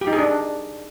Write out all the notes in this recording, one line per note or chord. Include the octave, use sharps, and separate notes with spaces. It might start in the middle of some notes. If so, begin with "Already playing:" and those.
G4
D#4
G#4
D4